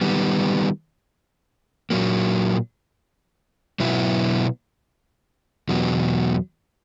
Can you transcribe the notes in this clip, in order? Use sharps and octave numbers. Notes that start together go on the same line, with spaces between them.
D#3 G3 B3
A#2 F#3 A#3
B2 F#3 B3 E4
E2 B2 F#3